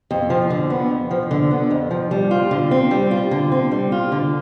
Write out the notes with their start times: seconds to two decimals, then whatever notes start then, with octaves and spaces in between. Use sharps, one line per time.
0.11 F2
0.30 F3
0.50 D3
0.70 B3
0.90 F2
1.11 F3
1.31 D3
1.51 B3
1.71 F2
1.91 F3
2.11 G3
2.31 F4
2.51 D3
2.71 C4
2.91 G3
3.11 F4
3.31 D3
3.52 C4
3.72 G3
3.92 F4
4.12 D3